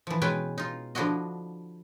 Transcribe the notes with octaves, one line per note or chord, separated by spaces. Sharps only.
E3 F3
B2 G#3 C#4 B4 G5 G#5
D#4 F4
D3 F3 D4 E4 F#4 D#5